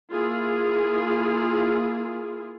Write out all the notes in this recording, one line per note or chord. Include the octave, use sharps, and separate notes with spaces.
A#3 E4 F4 G#4